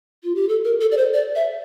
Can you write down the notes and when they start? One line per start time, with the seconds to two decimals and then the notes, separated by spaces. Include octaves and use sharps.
0.24 F4
0.35 G4
0.49 A4
0.65 A#4
0.81 A4
0.92 D5
0.97 C5
1.14 D5
1.35 E5